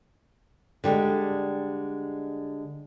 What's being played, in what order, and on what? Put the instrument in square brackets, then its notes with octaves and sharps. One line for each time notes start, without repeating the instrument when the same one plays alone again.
[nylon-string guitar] D3 G3 G#3